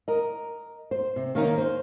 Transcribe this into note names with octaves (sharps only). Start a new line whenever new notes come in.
A#4 D#5
C5
C3
D#3 A#3 C#4 D#4
C5